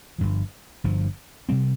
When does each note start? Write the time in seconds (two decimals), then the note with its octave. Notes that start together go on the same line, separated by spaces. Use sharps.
0.18 G1 G2 F3
0.84 G1 G2 F3
1.49 C3 G3 C4